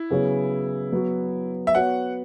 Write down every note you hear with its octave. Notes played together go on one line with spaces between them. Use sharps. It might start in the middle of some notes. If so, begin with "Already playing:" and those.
Already playing: E4
C#3 F#3 B3 G#4 C#5
F#3 B3 F#4
E5
B3 F#4 C#5 F#5